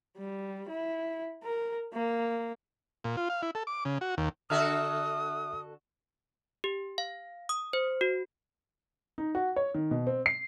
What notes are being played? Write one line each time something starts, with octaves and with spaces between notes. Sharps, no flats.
G3
E4
A#4
A#3
A#2
F4
F5
E4
A4
D6
C#3
F#4
D#2
D3 F#4 A4 E5 D#6 F6
G4
F5
D#6
C5
F#4
D#4
F#4
C#5
D#3
B2
C4
C7